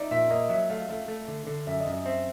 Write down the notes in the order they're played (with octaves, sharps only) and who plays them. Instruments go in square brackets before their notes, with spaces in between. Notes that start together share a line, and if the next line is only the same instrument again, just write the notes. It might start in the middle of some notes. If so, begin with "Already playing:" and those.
Already playing: [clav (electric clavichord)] D#4 [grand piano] D5 E5
[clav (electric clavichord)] A#2 [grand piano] E5
[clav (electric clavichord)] A#3 [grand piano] D#5
[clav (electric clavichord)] F#3 [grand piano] E5
[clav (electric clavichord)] A3 [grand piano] F5
[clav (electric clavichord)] A3 [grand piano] F5
[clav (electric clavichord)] A3
D3
D3
[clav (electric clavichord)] F#2 [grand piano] E5
[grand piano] D#5
[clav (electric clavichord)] F#2
[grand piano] D#5
[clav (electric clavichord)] C4 [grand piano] E5